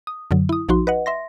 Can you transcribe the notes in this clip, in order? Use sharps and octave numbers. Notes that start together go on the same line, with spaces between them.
D#6
F#2 D3 F#3
E4 D#6
A#1 F3 D#4 F#4 C6
B4 D#5 F#5
E5 C6 A#6